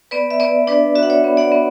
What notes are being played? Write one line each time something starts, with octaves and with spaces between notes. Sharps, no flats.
B3 B4 D5
E5
B3 B4 D5
D4 B4 D5
F#4 E5
F#5
C#5 E5
B3
D5 F#5
B3